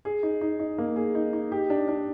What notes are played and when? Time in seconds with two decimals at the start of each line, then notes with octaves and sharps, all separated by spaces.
0.05 G#4
0.23 D#4
0.41 D#4
0.59 D#4
0.78 A#3
0.96 G#4
1.15 D#4
1.33 D#4
1.52 G4
1.70 D4
1.88 D4